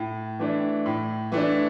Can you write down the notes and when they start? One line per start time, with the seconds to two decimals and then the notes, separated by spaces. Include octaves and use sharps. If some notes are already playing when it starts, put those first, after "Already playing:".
Already playing: A2
0.39 E3 A3 D4
0.86 A2
1.32 E3 A3 D4